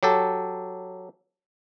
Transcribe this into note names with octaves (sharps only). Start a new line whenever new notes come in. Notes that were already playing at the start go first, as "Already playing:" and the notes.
F#3 G4 A4